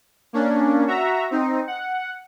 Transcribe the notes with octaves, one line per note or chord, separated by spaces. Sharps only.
A#3 C#4 D4
F#4 E5 A#5
C4 D#4
F#5